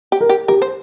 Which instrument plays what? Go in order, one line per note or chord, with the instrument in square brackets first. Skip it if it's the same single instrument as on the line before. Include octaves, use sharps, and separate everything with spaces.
[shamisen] G4
[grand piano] A#4
[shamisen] G4
[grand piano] G4 [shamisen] A#4
[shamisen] C5